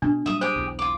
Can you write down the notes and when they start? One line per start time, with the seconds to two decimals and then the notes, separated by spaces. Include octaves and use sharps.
0.02 B2 D4
0.26 A#2 F#3 G3 E5 D#6
0.41 G4 G#4 C5 D#6
0.55 B1 E2
0.79 F4 D6